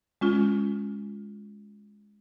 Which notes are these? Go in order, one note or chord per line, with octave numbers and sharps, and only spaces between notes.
G#3 C#4 F4